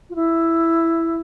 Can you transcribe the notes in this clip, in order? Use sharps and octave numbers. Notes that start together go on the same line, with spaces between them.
F4
E4